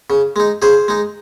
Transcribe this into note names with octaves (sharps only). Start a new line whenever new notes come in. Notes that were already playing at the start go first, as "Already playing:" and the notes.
C#3
G#3 D#4
C#3 G#4 C5
G#3 D#4